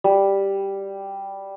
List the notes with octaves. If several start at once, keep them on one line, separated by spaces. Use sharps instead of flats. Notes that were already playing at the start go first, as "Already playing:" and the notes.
G3